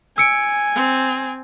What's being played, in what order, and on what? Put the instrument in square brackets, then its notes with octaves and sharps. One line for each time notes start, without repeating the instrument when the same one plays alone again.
[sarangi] G#5 [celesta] E6 C#7 D7
[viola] C4